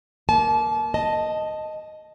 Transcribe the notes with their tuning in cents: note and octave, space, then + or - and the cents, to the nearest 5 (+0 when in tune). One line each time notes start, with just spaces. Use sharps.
A#3 +0 A5 -35
D#5 +0 A5 +0